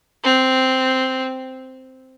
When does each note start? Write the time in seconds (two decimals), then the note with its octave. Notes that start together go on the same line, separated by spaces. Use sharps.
0.24 C4